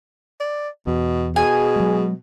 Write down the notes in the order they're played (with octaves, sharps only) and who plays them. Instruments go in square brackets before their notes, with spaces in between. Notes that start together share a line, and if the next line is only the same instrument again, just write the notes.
[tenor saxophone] D5
[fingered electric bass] E2 [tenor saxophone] B2
[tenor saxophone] B2 [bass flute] G#4 [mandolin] G#5
[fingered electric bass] F#3 G#3